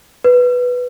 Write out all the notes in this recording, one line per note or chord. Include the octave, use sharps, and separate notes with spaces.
B4